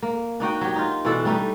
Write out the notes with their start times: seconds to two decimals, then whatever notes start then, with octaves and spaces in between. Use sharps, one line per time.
0.02 A#3
0.40 D4 D#4 F#4 G5
0.61 F#3 G4
0.76 D#4 F4
1.05 B2 E3 D4 A4
1.25 G3 A3 D#4